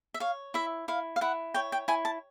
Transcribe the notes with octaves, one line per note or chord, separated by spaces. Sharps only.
E5
C#5 F5
E4 E5
E4 F5
F5
E4 F#5
C#5 G5
G5
E4 G#5
A5